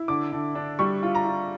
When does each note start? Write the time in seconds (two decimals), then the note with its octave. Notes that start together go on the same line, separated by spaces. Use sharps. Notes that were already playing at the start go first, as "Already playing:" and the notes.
Already playing: E4
0.08 D3 D6
0.33 D3
0.55 D4
0.79 G3 C#6
1.03 F4
1.15 A#5
1.25 F4